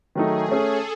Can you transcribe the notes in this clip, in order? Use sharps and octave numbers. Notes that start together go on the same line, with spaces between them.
D#3 F#3 A3 D#4 G#4
A3 C#4 G#4 A4